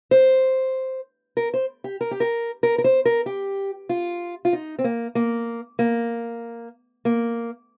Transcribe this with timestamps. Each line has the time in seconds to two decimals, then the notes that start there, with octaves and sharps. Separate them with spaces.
0.11 C5
1.37 A#4
1.54 C5
1.84 G4
2.01 A#4
2.11 G4
2.20 A#4
2.63 A#4
2.78 A#4
2.84 C5
3.05 A#4
3.26 G4
3.89 F4
4.45 F4
4.53 D#4
4.79 C4
4.84 A#3
5.15 A#3
5.79 A#3
7.05 A#3